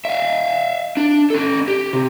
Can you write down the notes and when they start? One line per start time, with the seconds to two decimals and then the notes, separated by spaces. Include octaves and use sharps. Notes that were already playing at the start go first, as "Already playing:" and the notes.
0.05 E5 F5
0.97 D4
1.30 C#4 A4
1.68 G4
1.93 C3